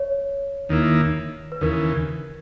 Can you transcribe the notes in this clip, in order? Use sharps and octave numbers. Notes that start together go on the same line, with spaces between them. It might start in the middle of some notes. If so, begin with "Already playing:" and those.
Already playing: C#5
D#2 D#3 A#3 E4
B4
D#2 C#3 E3 A#4